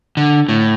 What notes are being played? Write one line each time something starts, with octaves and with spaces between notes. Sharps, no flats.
D3
A2